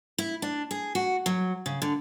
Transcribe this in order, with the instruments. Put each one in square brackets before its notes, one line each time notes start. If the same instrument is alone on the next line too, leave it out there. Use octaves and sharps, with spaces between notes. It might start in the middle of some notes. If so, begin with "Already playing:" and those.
[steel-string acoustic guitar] E4
D4
G#4
F#4
F#3
C#3
D3